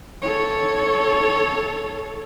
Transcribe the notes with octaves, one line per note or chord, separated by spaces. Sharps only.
A4 C#5